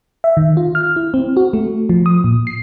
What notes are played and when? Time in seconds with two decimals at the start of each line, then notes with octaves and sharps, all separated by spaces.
0.24 E5
0.37 D#3
0.57 F4
0.75 F6
0.96 E4
1.14 C4
1.37 F#4
1.53 A3
1.89 F3
2.06 D#6
2.24 A#2
2.47 C7